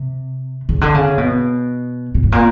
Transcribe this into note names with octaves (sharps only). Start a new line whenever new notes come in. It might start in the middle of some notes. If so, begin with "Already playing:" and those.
Already playing: C3
C#3
D3
C#3
B2
A#2
A2
A#2